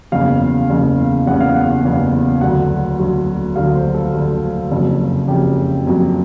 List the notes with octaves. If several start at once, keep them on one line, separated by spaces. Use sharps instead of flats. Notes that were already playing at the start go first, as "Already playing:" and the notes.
F#1 E2 C#3 F5
F#1 E2 C#3
F#1 E2 C#3 F#5
F5
F#5
F#1 E2 C#3
D2 D3 F#3 F#5
D2 D3 F#3
D2 D3 F#3 F5
C5
A4
D2 D3 F#3
F#1 F2 C#3 F#3
F#1 F2 C#3 F#3 G4
F#1 F2 C#3 F#3